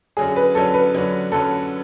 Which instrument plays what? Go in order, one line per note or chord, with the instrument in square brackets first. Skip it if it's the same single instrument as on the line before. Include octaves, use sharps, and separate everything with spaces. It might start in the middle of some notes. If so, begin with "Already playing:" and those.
[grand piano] F#2 D3 F#3 C#4 [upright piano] G#4
[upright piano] B4
[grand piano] F#2 D3 F#3 C#4 [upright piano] A4
[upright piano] B4
[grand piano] F#2 D3 F#3 C#4
[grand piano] F#2 D3 F#3 C#4 [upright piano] A4